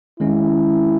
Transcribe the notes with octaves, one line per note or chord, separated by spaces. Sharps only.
D#3 G#3 C#4 E4